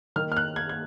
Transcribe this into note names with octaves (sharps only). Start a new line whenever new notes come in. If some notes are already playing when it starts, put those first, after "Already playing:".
D#3 A#3 D#4 F6
F6
F#6
G#6
G#6